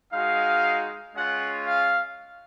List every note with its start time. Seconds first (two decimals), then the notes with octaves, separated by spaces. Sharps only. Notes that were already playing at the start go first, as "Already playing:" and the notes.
0.12 G#3 D#4 F#4 F5
1.15 G#3 C#4 F4 F#5
1.66 F5